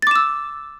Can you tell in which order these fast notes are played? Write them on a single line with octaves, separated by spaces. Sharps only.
A6 D6 E7 E6